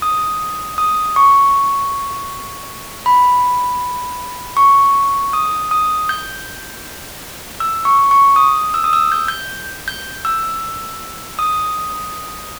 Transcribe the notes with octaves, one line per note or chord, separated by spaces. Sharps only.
D#6
D#6
C#6
B5
C#6
D#6
D#6
G6
E6
C#6
C#6
D#6
E6
D#6
E6
G6
G6
G6
E6
D#6